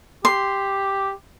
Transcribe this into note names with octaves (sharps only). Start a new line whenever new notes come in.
G4 C6